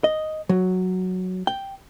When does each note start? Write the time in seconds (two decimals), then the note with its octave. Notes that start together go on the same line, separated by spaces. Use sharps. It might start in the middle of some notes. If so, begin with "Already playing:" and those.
0.04 D#5
0.49 F#3
1.47 G5